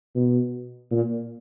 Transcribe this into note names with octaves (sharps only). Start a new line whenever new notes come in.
B2
A#2